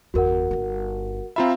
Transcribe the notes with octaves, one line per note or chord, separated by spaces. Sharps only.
G1 E2 F#4 A#4 F#5
G1 D#4
C4 F4 E5 F5 A#5 B5